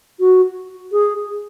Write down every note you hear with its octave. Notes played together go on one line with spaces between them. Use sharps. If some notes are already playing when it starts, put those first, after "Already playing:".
F#4
G#4